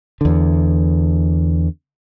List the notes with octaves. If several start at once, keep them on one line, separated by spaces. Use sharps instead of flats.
E2 D3